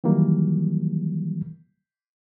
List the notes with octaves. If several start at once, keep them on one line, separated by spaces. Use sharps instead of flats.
D#3 E3 F#3 G3 A#3